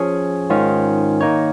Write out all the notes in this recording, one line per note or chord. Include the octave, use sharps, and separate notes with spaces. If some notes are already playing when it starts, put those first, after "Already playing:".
Already playing: F3 C#4 G#4 C#5
G#2 D#3 C#4 F4
D#3 A#3 D#4 C#5